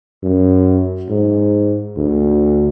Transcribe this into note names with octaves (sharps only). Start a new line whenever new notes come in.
F#2
G#2
D2